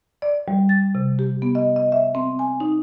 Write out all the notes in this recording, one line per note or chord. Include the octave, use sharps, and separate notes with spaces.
D5
G3
A6
C3
G4
B3
D#5
D#5
E5
C4
G#5
D#4